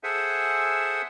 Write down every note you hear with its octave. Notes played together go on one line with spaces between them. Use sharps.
G#4 A4 C5 E5 F#5 G#5